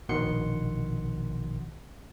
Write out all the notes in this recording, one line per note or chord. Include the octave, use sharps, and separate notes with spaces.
A#1 B2 D#3 F#5 C6 C#7